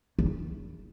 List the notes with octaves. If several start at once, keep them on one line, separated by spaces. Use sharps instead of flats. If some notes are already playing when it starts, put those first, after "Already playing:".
E2